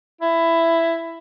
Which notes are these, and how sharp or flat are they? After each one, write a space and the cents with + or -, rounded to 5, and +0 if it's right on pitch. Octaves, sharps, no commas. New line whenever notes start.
E4 +10